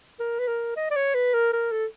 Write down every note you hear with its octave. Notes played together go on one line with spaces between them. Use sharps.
A#4
B4
A#4
D#5
D5
C#5
B4
A#4
A#4
A4